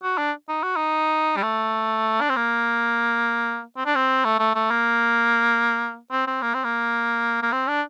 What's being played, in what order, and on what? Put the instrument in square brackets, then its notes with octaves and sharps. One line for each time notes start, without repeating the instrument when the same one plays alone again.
[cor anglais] F#4
D4
D#4
F#4
D#4
G3
A3
D4
C4
A#3
C4
D4
C4
A3
A3
A3
A#3
C4
C4
A#3
C4
A#3
A#3
C4
D4